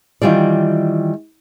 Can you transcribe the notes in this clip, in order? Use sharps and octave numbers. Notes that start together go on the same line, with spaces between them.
D#3 E3 G3 F4 D5